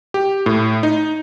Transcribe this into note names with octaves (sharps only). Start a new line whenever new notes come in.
G4
A2
D#4